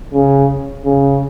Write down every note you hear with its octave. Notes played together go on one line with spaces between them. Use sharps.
C#3
C#3